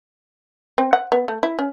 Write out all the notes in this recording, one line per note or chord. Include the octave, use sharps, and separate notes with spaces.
C4
F#5
B3
A3
E4
C#4